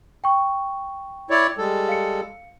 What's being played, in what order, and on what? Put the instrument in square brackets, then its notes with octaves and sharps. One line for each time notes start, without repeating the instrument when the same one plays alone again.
[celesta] G5 C#6
[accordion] E4 C#5 D5
G3 G#3 A4
[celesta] F5 C#7